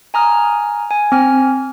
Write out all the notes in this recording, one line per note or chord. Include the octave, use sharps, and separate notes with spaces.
G#5 A#5 D#6 F6
G#5
C4 G#5 F6